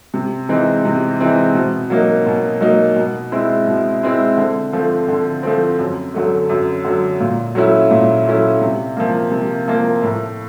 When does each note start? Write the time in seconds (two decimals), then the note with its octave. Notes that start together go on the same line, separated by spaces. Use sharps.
0.14 C3
0.49 E3 G#3 C4 D#4
0.85 C3
1.20 E3 G#3 C4 D#4
1.55 B2
1.90 F#3 A#3 D#4
2.26 B2
2.61 F#3 A#3 D#4
2.96 B2
3.32 G#3 C4 E4
3.67 B2
4.03 G#3 C4 E4
4.37 D3
4.73 F3 A3 C4
5.08 D3
5.43 F3 A3 C4
5.79 F#2
6.14 D3 F#3 A3
6.50 F#2
6.85 D3 F#3 A3
7.20 A#2
7.55 F#3 A3 C#4 E4
7.91 A#2
8.26 F#3 A3 C#4 E4
8.61 C3
8.97 F3 A#3
9.31 C3
9.68 F3 A#3
10.02 A2